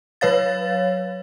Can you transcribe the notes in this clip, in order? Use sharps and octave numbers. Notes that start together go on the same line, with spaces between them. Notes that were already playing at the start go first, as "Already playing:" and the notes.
F#3 B4 C#5 F5 A6